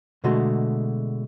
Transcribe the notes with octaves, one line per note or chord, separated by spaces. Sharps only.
B2 D3 G#3 A3 F#4 C6